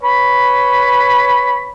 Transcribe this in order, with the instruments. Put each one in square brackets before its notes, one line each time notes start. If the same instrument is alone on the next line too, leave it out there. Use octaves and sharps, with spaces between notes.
[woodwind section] B4 C#5 B5